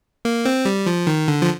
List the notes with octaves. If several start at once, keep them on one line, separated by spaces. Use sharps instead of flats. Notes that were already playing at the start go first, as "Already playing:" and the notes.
A#3
C4
G3
F3
D#3
D3
F3